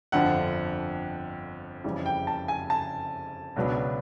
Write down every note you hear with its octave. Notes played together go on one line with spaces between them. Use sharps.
G1 F2 D3 F3 F#5
F#1 F2 C#3 E3 G3
G5
A5
G#5
A5
C#2 B2 F#3 B3 D4